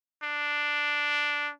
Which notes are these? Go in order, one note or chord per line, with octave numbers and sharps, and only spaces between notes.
D4